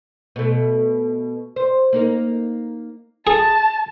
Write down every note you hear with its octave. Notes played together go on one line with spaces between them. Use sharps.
B2 A3
C5
A#3 D#4 A#4
G#4 A5